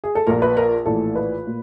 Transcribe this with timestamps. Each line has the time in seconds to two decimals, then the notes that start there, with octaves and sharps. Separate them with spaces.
0.04 G#4
0.15 A4
0.27 A#1 A#2 A#4
0.42 B4
0.57 A#4
0.86 A#1 A2 E3 A4
1.16 B4
1.47 A#2